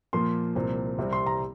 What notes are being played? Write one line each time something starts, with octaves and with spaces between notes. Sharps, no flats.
A#2 F3 A#3 C6
C2 A#2 F3 C4
C2 C3 G3 C4
C6
A#5